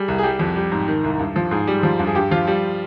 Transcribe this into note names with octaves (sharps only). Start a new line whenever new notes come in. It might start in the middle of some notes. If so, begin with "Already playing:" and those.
Already playing: G3 G#4
C2
G#4
G3 G4
F2
G3
G#2
D#3
C2
G2
F3
G#2 G#4
G3
F3
G2
G#4
G2 G4
F3 F4
G3